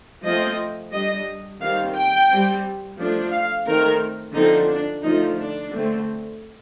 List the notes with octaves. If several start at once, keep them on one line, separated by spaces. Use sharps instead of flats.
F3 A3 C4 D#5
G3 D4 D#5
D#3 G3 C4 F5
G5
G3 C4
F3 A3 D4
F5
D#3 A3 C4 A#4
D3 F3 C4 D#4
D4
D3 F3 A3 D#4
D4
D3 A3 C4